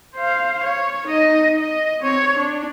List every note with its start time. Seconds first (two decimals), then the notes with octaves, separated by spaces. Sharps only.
0.16 C5 F5
0.64 C#5
1.07 D#4 D#5
1.59 D#5
2.01 C4 C#5
2.37 D4